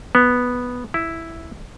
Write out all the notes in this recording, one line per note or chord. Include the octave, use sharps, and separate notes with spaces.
B3
E4